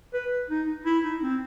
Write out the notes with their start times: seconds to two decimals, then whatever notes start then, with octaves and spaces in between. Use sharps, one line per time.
0.14 B4
0.50 D#4
0.86 E4
1.04 D#4
1.22 C4